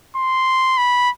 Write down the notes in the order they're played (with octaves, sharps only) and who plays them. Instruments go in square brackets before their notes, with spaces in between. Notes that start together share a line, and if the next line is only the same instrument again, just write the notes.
[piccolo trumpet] C6
B5